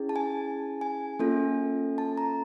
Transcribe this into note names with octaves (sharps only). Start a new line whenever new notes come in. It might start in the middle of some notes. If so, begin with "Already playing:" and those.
Already playing: C#4 E4 G#4
A5
G#5
G#5
A#3 C#4 F4 A4
A5
A#5